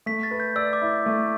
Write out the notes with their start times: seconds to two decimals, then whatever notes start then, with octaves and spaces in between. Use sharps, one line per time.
0.06 A3 B6
0.23 A6
0.31 B4
0.40 G6
0.56 D5 E6
0.73 D6
0.82 E4
1.06 A3